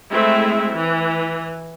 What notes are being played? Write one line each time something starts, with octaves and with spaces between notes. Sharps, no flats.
G#3 A3 C4 E4 E5
E3